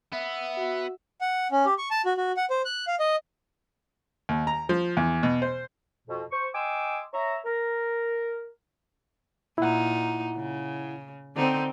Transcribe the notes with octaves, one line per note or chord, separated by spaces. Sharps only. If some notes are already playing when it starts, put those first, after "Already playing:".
B3 E5
F#4
F#5
C#4
G4
C#6
A5
F#4
F#4
F#5
C5
F#6
F5
D#5
D#2
A#5
F3
E2
B2
C5
F2 B2
C5 C#6
D#5 G5 G#5 C6 D6 E6
C#5 E5 A#5
A#4
A#2 D#4 E4 F#5
C#3
D3 C4 D#4